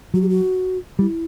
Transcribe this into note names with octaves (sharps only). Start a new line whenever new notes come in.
F#3 F#4
G4
F#4
G3 E4